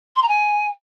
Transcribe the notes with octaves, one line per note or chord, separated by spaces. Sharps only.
C6
A#5
G#5